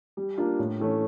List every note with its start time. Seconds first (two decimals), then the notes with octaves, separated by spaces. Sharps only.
0.17 G3
0.38 A#3 D4 F4
0.59 A2
0.80 E3 A3 C#4